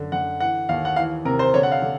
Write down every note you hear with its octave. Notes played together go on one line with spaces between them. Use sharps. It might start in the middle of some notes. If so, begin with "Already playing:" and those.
Already playing: F#2 D3
D3 F#5
E3 F#5
D#2 F5
F#5
E3 F5
C3 A#4
C5
D3 C#5
F#5
F5
D3